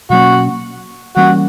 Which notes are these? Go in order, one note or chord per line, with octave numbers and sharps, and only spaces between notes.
B2 F#3 A#3 C#4 F#4
E3 G3 A#3 C#4 F#4